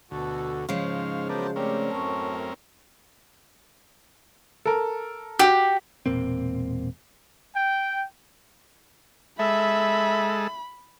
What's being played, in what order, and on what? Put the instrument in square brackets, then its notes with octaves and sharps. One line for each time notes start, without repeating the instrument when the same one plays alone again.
[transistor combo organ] D2 [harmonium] B2 F#4 A4
[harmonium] G#2 [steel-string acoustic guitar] C#3 F3 G#3 [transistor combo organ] C5 C#5 F5
[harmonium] F#3 C5 A5 [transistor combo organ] B3 A#4 D5
[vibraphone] A3 C#5 D5 [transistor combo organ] C4 C#4 A#4 [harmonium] G4
[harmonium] F#2 A2 [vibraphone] A5 C#6
[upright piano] A4 A#4
[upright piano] F#4 [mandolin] G4
[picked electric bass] E1 A#2 A#3 C4
[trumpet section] G5
[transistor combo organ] G#3 A4 [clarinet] E5 [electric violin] B5